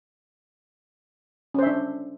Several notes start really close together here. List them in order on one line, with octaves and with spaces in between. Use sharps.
C#4 C5 E5 D4